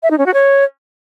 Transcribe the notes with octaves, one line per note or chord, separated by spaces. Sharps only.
E5
D#4
C#4
F#4
C#5